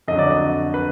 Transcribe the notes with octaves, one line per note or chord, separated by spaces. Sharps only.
F2 D3 F#3 D#5
D5
D#5
B4